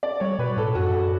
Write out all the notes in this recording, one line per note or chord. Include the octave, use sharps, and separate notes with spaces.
D5
G3 C#5
B2 B4
A2 A4
F#2 F#4
A4